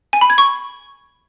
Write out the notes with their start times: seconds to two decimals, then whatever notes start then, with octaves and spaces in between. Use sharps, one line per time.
0.13 G#5
0.21 B5
0.30 G#6
0.38 C#6